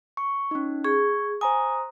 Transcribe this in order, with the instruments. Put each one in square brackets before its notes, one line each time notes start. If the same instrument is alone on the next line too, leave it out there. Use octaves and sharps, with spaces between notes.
[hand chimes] C#6
C#4 D#4
[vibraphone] G#4 [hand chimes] C#6
[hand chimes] C5 A#5 D#6 [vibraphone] G#5